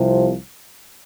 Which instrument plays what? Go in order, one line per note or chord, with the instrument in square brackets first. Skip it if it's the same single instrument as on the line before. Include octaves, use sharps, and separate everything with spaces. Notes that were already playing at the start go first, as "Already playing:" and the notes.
Already playing: [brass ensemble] C2 C3 F3